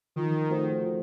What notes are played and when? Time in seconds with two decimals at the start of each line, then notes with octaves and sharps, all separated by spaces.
0.16 D#3 F3
0.49 A3 C4 F#4 C5
0.81 F3